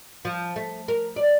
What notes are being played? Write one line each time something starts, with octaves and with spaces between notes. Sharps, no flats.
F3
A3
A#4
D5